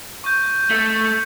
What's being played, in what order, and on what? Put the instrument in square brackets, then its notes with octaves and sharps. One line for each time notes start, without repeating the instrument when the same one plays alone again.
[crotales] C#6 G6
[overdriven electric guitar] A3 [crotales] C#7